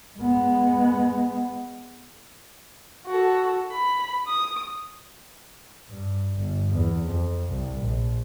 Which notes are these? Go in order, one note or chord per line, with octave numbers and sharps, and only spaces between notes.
G#3 B3
F#4 A4
B5
D#6
G2
G1
E2
F2
C2
A#1